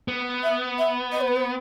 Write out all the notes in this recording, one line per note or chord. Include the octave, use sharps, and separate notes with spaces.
B3
E5
E5
D#5
C5
B4
C5